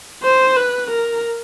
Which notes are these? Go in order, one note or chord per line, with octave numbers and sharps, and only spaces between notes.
C5
B4
A#4